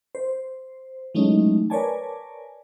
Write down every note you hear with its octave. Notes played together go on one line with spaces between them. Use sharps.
C5
E3 F#3 G#3 A3 C#4 D#4
A#4 B4 C#5 D5 G#5 A5